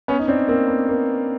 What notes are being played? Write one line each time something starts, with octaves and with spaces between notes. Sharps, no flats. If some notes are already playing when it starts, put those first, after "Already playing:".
B3 C#4
D#4
C4 D4
A#3 C4
B3
A#3